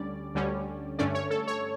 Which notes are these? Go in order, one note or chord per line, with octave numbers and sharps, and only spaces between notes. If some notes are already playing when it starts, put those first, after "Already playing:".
Already playing: D2 D3 G3 C#4 D5
D2 D3 G3 C#4
G2 D3 A3 C#4 D5
C#5
A4
C#5